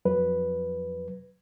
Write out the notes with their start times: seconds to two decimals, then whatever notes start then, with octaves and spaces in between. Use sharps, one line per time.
0.05 F2 F#3 B4